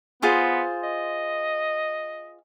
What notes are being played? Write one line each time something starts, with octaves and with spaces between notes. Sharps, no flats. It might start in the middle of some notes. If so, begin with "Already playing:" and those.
B3 F4 G#4 C5
D#5